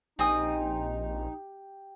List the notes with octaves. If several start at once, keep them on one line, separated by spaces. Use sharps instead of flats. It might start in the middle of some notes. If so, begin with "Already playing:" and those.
A#1 C4 D#4 G4 G#5 D#6